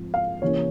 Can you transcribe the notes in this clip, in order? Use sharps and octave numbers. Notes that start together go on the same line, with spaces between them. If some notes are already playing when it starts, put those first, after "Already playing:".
Already playing: G#2 F3 C4
F5
C3 E3 A#3 C#4 C#5